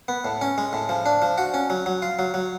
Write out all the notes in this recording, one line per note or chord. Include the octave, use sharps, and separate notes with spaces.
B3
A2
C#4
G#3
A2
F3
D4
F3
F#4
C#4
F#3
F#3
F4
F#3
F#3